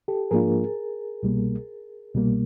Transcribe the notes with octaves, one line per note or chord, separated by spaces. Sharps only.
G4 A4
G#2 F3 A#3 D4 F4 G#4 A#4
C2 B2 G3 A#3
C2 B2 G3 A#3